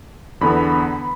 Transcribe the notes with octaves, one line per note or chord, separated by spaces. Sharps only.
E2 D3 B3 B5